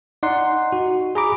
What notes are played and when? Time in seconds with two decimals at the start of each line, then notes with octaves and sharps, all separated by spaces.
0.23 D#4 D5 F#5 C6
0.72 F#4
1.15 G#4 G#5 A#5 B5 D6